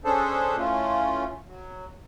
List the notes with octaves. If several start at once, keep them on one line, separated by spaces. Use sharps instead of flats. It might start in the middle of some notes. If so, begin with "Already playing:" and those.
C#4 D4 G#4 A4 C5 A5
E3 A3 C#4 F4
F#3